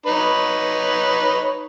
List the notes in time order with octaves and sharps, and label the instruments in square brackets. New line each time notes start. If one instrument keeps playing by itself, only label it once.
[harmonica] D#4 B4 C#5